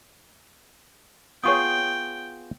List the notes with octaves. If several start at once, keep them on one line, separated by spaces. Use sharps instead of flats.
B3 F4 G#4 C#5 G5 C#6 D#6